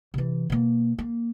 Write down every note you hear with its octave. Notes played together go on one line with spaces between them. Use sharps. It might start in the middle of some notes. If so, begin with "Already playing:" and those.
C3 E3
B2 A#3
A#3